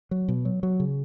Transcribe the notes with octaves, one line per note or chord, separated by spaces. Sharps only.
F#3
B2
F#3
F#3
C#3